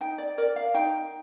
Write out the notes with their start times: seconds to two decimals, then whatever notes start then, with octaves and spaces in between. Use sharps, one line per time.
0.01 D#4 G5
0.18 D5
0.38 A#4 D5
0.56 F5
0.74 D#4 G5